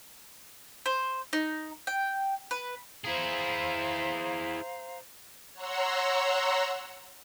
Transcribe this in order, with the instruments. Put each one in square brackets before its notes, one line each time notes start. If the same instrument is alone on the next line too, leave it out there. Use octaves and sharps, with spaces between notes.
[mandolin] C5
D#4
G5
B4
[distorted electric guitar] E4 G#4 [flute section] C5 F5 A#5
[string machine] C#5 F#5 A#5 C6 E6